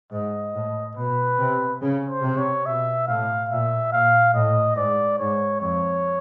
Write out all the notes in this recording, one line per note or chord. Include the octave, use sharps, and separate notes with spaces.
G#2 D#5
A2
B2 B4
C3
C#3
C5
C3
C#5
B2 E5
A2 F5
A#2 E5
A#2 F5
A2 D#5
G#2 D5
G#2 C#5
F2 C#5